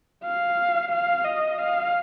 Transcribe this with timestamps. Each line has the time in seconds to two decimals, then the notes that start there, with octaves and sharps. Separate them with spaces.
0.24 F5
0.91 F5
1.24 D#5
1.58 F5